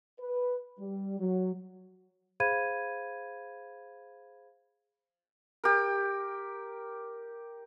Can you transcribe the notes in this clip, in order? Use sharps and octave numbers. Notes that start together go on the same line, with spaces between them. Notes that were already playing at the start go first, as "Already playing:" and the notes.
B4
G3
F#3
G#4 C5 F5 B5 G#6 D#7
G4 A#4